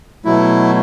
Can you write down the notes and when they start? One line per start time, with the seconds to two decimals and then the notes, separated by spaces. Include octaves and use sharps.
0.24 B2 F#3 A3 E4